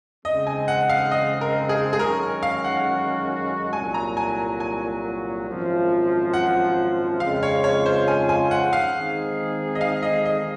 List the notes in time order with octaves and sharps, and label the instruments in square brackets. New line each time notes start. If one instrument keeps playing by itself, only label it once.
[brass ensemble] C#3 G#3 C4 [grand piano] D#5
[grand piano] G#5
F#5
F5
D#5
A#4
G#4
G#4
[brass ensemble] F#2 D#3 G#3 C#4 F#4 [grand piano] A#4
[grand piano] F5
F#5
[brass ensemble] C2 A#2 F#3 [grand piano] G#5
[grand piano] A#5
G#5
G#5
[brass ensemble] G#1 F#2 F3
[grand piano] F#5
[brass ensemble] F2 C#3 G#3 C4 F4 [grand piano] F5
[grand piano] C#5
C#5
C5
G#5
G#5
F#5
F5
[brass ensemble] D#3 G#3 C4 D#4 G#4
[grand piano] D#5
F5
D#5
D#5